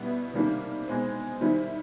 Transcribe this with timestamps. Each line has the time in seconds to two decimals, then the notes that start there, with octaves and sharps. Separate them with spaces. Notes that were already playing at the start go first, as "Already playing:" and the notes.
Already playing: B2 G3 B3 E4
0.34 C3 D#3 G3 A#3 D4
0.88 B2 G#3 C4
1.41 D#3 G3 C4 E4